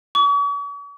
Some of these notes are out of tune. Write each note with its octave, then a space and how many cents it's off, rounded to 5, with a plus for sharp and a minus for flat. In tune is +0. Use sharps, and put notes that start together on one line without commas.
C#6 +45